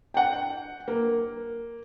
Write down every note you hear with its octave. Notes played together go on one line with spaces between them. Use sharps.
F#5 G5
A#3